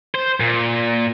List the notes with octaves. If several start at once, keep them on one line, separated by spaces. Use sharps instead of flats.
C5
A#2